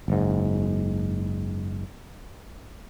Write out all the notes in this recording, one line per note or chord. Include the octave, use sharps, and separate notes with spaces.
F#1 G#2